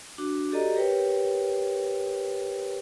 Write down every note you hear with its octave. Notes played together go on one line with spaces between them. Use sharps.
D4 F#4 D6
F#4 G4 A4 D5 D#5 A#5
G4 A#4 B4 C#5 G5